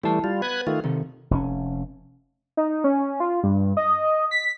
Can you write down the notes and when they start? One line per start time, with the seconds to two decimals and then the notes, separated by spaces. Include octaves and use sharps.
0.04 E3 G3 A3 E4 A5
0.24 G3 F4
0.42 B3 B4 F#6 G#6
0.67 D#3 A3 F4
0.84 C3 D#3 A4
1.31 F1 A#2 C#4
2.57 D#4
2.84 C#4
3.20 F4
3.43 G2
3.77 D#5
4.31 B6